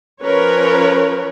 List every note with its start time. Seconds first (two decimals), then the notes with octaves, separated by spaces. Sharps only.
0.22 F3 C#4 A#4 B4 C#5